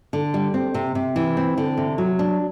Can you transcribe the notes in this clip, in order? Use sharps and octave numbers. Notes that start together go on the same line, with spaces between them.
D3
G3
C4
C3
C3
E3
C4
D3
C3
F#3
D4